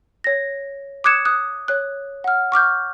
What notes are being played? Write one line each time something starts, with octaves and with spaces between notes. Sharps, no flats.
C#5 A#6
D6 D#6 F#6 G#6 C#7 E7
D#6 F#6
C#5 F#6
F#5 F6
C#6 D6 F6 G6